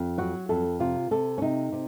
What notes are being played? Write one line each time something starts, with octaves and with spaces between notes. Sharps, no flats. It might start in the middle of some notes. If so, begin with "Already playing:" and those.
Already playing: F2
F#3 F#4
F2 A4
C3 F4
C3 A4
C#4
C3 D#4
C3